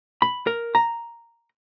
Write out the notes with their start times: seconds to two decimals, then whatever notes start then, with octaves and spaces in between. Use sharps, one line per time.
0.22 B5
0.47 A#4
0.75 A#5